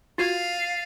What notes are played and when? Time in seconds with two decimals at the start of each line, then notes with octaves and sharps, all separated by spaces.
0.18 F4 F#4 F5 G#6 A6 C7 D#7